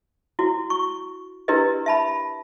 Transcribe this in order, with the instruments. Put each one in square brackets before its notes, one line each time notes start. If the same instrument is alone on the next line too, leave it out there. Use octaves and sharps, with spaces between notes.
[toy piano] E4 F#4
C#6
D4 E4 G4 A#4 B4 D#5
E5 A5 B5